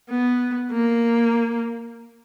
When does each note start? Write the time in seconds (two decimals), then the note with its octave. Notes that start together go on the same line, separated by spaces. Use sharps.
0.10 B3
0.72 A#3